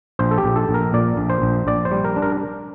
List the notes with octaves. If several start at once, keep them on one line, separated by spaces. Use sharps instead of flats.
A#1 C5
A4
G4
A#1
A4
A#1
A#4
A#2 D5
A#1
C5
A#1
A#1 D5
C5
G3
A#4
D4
A#4